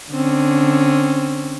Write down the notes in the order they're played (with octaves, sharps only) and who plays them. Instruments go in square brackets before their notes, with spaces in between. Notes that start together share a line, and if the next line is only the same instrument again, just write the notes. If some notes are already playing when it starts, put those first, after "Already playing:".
[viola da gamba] D3 C4 C#4